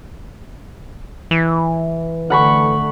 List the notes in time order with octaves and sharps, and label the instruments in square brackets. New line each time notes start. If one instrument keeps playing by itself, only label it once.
[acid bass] E3
[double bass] D3 A3 [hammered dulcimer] F#5 B5 C#6